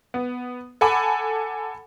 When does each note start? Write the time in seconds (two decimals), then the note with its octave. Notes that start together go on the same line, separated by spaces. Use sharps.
0.14 B3
0.81 A4 F#5 G#5 B5 D6